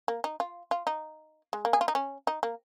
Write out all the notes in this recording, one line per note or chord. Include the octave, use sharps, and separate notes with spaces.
A#3
D#4
F4
F4
D#4
G#3
A#3
G#4
F4
D#4
C#4
D#4
A#3